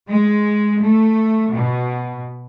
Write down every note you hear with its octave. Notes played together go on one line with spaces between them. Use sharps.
G#3
A3
B2